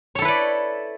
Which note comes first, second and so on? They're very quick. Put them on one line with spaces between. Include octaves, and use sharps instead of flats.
C#5 A4 E4 B4 D5